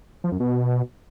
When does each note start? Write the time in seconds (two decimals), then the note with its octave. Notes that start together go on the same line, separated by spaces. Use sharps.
0.24 F3
0.32 F#2
0.40 B2